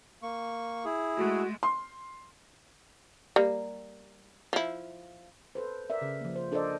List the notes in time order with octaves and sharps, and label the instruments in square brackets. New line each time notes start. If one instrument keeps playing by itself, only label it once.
[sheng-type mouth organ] A#3 C#6
E4 G#4
[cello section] G#3 A3 [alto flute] F#4
[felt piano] C6
[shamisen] G3 A#3
F3 E4
[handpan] A4 B4 C5
A#4 D5 E5
C#3
F3 A#3
C5
D4 A4 A#4 C5 D5 D#5